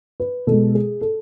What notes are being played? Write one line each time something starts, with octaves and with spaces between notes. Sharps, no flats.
B4
B2 G#3 A4
G#4
A4